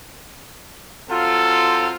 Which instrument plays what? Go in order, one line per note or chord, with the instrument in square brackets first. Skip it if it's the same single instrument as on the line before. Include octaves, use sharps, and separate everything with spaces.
[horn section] F#3 C4 F4 [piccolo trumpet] A4